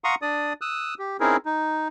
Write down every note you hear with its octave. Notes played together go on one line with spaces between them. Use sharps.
F5 F#5 A#5 C6 C#6 D#6
D4 D5 D#6
D#6 E6 F#6
G4
C4 C#4 D#4 E4 G#4 A#4
D#4